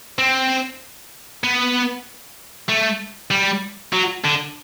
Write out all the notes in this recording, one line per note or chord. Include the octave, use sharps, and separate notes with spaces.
C4
B3
A3
G3
F#3
D3